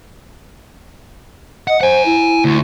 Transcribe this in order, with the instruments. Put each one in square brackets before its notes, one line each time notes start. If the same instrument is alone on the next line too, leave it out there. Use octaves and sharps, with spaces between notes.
[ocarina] D#5 [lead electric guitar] F#5
[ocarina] C5 [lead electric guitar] F#5 G#5
[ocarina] E4
[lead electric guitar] D2